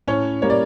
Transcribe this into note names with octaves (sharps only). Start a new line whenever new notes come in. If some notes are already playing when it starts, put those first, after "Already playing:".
A2 C#4 C#5
G3 A#3 C#5
D5